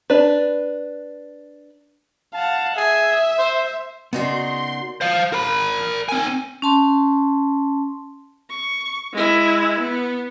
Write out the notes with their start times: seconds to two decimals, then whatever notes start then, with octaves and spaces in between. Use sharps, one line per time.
0.10 D4 B4
2.34 F5 F#5 A5
2.76 G#4 E5
3.38 C5
4.13 C#3 B3 D#4 F#4 A#4 D5 C6
5.01 C5 F5
5.33 A#4 B5
6.09 C4 G#5
6.62 C#4 A5 C6
8.50 C#6
9.13 G#3 E4
9.79 B3